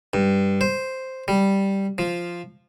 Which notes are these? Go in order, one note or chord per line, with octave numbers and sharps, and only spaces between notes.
G2
C5
G3
F3